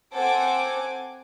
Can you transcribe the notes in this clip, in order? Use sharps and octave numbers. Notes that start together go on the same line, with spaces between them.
C4 A4 C5 F#5 G#5 D6